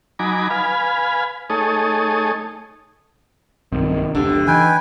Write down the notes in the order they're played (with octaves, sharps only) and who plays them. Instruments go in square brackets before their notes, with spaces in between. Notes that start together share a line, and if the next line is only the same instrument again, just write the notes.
[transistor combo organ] F#3 D#4 G#5 A#5 B5 D6
B4 F5 G#5 B5
A3 D#4 G#4 A4 C#5 D#6
[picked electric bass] B1 G2 C4 [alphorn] D#3
[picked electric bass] F1 C#2 D4 [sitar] D3 [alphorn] G4
[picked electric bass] E3 [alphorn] D#4 [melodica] B4 G5 G#5